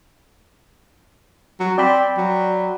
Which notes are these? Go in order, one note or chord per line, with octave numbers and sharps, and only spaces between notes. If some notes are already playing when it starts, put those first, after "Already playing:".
F#3
C4 D5 G5 B5
F#3